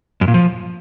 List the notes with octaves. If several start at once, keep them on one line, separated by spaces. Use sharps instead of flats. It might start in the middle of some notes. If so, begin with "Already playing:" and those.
F#2
A#2
F3